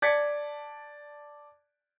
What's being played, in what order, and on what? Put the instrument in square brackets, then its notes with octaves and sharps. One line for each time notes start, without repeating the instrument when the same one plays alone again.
[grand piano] D5 A5 G#6 B6 C#7